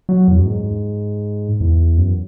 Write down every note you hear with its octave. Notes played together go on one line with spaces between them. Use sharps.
F#3
E2
F#2
G#2
E2
F#2